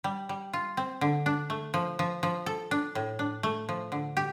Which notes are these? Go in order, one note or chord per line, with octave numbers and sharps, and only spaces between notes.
G3
G3
F4
C4
D3
D4
A3
F3
F3
F3
A4
D4
A2
D4
A3
F3
D3
G4